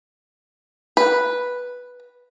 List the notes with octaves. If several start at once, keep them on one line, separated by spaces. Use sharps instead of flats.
B4